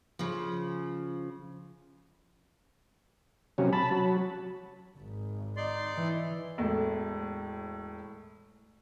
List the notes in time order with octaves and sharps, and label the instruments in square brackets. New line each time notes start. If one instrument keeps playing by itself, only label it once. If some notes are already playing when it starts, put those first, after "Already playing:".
[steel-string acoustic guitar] C#3 F3
[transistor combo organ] C3 F#3 C#4
A5 B5
F#3
[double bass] G#1
[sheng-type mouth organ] D#4 D5 C6
[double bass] E3
[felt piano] E1 A2 A3